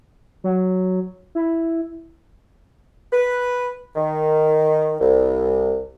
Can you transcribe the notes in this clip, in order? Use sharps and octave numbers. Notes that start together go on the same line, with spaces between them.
F#3
E4
B4
D#3
C2